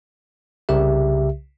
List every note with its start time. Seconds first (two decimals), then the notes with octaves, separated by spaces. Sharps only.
0.69 C2 C#3 G4 E5